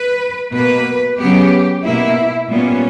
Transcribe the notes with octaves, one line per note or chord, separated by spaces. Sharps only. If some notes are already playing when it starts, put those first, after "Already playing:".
Already playing: B4
B2 A#3 B4
C#3 F#3 B3 G4
B2 A#3 E4
A#2 G3 B3 C#4